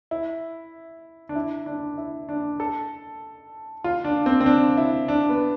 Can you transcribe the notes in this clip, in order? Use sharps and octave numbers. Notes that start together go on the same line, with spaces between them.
E4
D4
E4
D4
E4
D4
A4
F4
D4
C4
C4
D4
E4
D4
B3